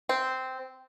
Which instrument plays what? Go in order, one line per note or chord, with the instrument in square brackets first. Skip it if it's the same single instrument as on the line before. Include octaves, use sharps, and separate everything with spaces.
[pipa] C4